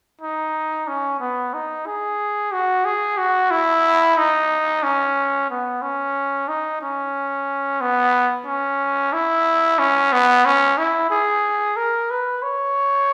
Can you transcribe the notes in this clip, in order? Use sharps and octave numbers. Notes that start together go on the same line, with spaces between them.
D#4
C#4
B3
D#4
G#4
F#4
G#4
F#4
E4
D#4
C#4
B3
C#4
D#4
C#4
B3
C#4
E4
C#4
B3
C#4
E4
G#4
A#4
B4
C#5